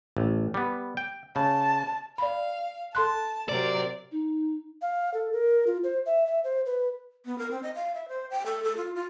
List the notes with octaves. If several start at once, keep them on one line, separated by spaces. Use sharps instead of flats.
A1
G3 B3
G5
C#3 A5
D5 F5 B5
A4 A5 C6 F#6
C3 F#3 A#4 D5
D#4
F5
A4
A#4
F4
C5
E5
E5
C5
B4
B3
A#4
C4
D#5
F5
E5
C5
G5
A4
A4
F4
F4